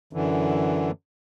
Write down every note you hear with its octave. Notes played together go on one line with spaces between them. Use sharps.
F#2 D3 E3